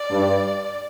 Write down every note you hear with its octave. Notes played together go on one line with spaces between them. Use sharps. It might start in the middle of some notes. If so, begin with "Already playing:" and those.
Already playing: D5
G2